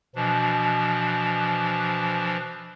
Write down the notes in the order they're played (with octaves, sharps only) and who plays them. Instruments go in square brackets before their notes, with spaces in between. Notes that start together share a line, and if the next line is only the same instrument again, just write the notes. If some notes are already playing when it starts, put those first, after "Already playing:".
[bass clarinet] B2 [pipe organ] E3 F3 D4